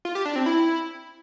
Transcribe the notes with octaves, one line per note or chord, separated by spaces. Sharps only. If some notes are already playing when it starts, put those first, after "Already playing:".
F4
G4
D4
C4
E4